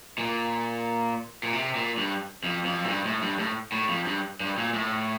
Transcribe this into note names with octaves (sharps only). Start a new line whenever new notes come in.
A#2
A#2
C3
A#2
G2
F2
F2
A2
G2
A2
G2
A2
A2
F2
G2
G2
A#2
A2